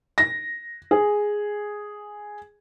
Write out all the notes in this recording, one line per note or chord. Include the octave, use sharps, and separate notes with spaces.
A#6
G#4